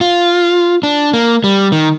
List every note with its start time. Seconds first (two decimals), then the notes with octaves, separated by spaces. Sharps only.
0.01 F4
0.83 D4
1.13 A#3
1.44 G3
1.72 D#3